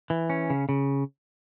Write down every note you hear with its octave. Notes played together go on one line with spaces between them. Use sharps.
E3
C#4
C#3
C#3